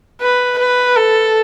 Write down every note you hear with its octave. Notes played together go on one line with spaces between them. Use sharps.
B4
B4
A4